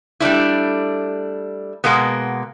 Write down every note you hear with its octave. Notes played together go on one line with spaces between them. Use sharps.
G3 A3 D4 E4
B2 G#3 A#3 B3